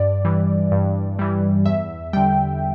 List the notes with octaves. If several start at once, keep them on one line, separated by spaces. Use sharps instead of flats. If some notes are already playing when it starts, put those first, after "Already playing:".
Already playing: G2 D5
E3 G3
G2
E3 G3
E2 E5
D3 G3 G5